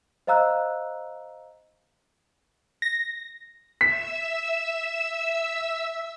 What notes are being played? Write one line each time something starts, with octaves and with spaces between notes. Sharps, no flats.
C5 D#5 F5 A#5 E6 F#6
A#6
E5 E6 B6